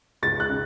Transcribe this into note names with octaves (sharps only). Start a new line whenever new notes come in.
C#2 A6
F#6
C#3